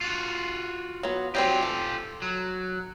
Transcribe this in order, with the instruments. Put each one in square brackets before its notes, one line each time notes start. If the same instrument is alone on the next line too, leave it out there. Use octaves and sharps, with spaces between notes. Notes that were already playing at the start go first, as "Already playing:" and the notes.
[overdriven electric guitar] F4 F#4
[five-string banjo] F#3 B3
[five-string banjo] F#3 G3 C4 [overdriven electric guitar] F4 G4
[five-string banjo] A4
[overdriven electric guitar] F#3